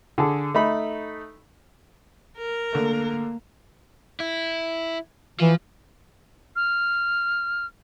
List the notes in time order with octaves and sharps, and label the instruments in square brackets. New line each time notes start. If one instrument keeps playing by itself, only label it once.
[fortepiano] D3 G#4 A4
A3 D#4 B5
[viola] A#4
[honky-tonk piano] D3 A3 [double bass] A#3
[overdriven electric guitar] E4
[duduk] E3 [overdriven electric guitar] F3
[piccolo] F6